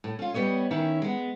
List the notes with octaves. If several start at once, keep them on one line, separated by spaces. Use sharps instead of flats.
A2
C#4 F4
G3 B3 C#5 D#5
D#3 C#4 E4
G#3 B3